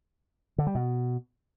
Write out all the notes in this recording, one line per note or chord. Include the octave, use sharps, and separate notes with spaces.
D3
G3
B2